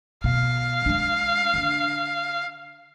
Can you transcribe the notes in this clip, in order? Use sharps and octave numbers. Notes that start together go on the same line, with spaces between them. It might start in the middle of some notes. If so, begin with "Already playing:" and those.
B2 F5
G#3 D4
D3 D4